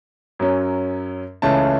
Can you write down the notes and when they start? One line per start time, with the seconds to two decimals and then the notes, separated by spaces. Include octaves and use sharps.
0.39 F#2 F#3 C#4
1.42 C#2 C#3 E3 A3 C#4 A5